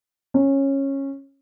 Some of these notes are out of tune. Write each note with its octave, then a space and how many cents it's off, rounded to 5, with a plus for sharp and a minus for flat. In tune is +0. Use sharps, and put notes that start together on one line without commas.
C#4 -15